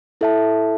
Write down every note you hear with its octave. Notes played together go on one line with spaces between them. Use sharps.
E4 A4 E5 A5